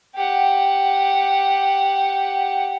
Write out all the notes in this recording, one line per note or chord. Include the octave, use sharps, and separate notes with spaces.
G4 F#5